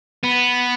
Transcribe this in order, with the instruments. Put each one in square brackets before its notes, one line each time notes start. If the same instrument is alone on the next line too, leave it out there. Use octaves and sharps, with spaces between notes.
[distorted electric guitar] B3